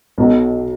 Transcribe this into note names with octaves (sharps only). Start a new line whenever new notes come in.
B1 B2 F#3